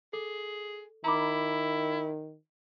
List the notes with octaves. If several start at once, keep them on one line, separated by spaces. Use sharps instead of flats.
G#4 A4
D#3 E4 A#5 B5 D6